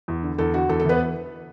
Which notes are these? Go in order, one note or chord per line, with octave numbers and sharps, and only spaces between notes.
E2
D3
E2 A4
D3 F#4
E2 A4
A4
E3 B3 B4